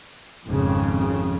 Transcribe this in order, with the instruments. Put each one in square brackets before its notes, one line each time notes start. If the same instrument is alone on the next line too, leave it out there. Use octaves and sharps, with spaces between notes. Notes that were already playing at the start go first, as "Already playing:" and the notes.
[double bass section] G#1 F2 C#3